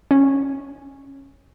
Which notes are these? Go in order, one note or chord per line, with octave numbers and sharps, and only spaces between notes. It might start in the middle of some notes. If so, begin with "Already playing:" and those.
C#4